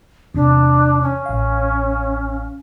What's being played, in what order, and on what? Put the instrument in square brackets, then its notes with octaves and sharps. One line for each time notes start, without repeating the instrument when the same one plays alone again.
[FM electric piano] E2 C3 [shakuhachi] D4
[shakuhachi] C#4
[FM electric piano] A1 F5